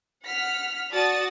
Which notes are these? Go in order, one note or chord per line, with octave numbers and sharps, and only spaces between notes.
F#5 F6 B6
F#4 D5 A5 D#6 A6